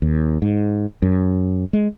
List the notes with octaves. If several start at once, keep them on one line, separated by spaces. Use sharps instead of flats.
D#2
G#2
F#2
G#3